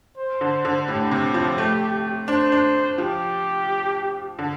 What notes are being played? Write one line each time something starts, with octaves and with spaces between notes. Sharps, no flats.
C5
D3
D3
A2 G4
C3
F3
A3
D4 C5
D4
F3 G4
D3